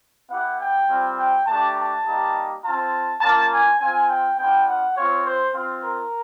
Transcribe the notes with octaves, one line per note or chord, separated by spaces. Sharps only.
B3 E4 G4 F#5
G5
G3 C4 F4
G5
A3 D4 G4 A5
A5
G3 A#3 D#4 G4
C4 F4 A5
A#3 C#4 F4 A5
G#5
C4 F4 G#5
G5
B3 D4 F4 G5
F#5
C4 F4 C#5
C5
C4 F4
A#4